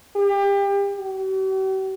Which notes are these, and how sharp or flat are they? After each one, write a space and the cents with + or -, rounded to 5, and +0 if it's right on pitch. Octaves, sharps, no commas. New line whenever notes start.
G4 +30
G4 -45